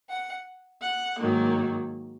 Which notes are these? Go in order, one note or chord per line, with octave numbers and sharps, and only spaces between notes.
F#5
F#5
G#2 D#3 F#3 A#3